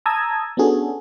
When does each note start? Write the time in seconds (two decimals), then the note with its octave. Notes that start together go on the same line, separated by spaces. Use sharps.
0.06 A5 A#5 D#6 E6 G#6
0.57 B3 C#4 D4 F#4 G#4 A4